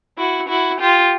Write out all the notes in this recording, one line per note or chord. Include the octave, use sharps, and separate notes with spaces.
E4 F#4
E4 F#4
F4 G4